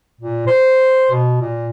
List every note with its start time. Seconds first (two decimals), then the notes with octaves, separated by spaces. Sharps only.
0.21 A#2
0.47 C5
1.11 B2
1.41 A#2